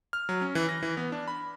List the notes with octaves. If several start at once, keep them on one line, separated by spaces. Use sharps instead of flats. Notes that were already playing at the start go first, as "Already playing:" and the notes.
F6
F#3
C#4
E3
A#6
E3
B3
D4
B5